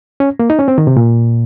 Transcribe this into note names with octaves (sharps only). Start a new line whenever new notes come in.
C#4
A#3
D#4
C#4
C4
D#3
C3
A#2